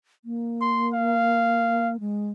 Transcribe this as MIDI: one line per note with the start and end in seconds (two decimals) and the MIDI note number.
0.25 1.97 58
0.61 0.88 84
0.94 1.91 77
2.00 2.31 56